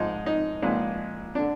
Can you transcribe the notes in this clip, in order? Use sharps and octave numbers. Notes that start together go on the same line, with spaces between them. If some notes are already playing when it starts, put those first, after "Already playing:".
Already playing: G#2 F3 G#3 D#4
D#4
A#1 A#2 G#3
D3 D4